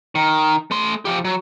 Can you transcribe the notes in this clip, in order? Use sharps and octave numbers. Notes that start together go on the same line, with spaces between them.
D#3
A3 C6
F3 G4
F#3